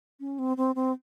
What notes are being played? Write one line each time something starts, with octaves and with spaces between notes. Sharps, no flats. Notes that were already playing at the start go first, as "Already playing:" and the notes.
C#4
C4
C4
C4